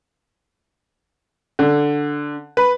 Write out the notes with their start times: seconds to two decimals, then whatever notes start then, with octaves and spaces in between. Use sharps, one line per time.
1.59 D3
2.57 B4